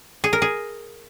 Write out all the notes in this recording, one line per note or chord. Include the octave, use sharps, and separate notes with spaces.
G#4
A#4
G#4